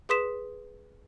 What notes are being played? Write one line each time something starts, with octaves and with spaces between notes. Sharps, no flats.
G#4 B4 C6 D#6 B6 E7